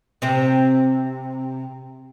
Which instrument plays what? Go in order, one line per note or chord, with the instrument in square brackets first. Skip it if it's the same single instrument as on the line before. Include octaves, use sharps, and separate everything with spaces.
[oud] C3 C4